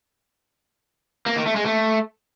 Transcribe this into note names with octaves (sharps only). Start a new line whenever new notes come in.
A#3
D#3
A3
G#3
A3